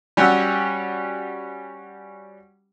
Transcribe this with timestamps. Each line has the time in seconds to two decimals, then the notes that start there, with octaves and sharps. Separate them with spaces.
0.17 G3 C#4 F#4 G4 F#5 E6